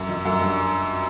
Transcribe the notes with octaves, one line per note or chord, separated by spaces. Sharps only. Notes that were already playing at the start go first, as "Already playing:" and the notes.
Already playing: F#2
F2
F#2
G2